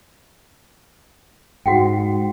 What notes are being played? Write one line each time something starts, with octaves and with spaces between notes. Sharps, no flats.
G#2 F#4 F#5 G5